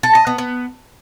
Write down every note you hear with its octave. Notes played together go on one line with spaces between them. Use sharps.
A4
D#5
B3
B3